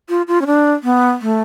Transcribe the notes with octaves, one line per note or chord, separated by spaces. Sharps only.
F4
F4
C#4
D4
B3
A3